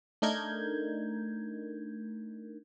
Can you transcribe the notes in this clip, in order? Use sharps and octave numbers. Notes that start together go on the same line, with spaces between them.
A3 D4 D#4 A#4 G6 G#6